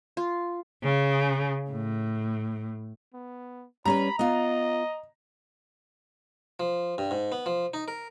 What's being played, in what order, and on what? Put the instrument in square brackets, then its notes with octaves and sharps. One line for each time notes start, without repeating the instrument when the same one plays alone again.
[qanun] F4
[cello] C#3
A2
[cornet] B3
[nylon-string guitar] G3 C#4 B4 [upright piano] A#5 [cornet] B5
[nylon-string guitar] B3 F4 [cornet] D#5
[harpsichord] F3
G2
G#2
B3
F3
D#4
A#4